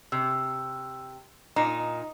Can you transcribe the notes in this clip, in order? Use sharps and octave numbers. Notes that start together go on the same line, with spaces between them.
C3 E6
A#2 D#4 A#5